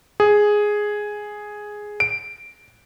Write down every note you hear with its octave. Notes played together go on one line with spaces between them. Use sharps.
G#4
D7